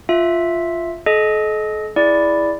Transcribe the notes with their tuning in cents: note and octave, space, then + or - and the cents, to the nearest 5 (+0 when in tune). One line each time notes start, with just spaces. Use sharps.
F4 +0 E5 +0
A4 -40 D#5 +0
E4 +0 G#4 +0 D5 +0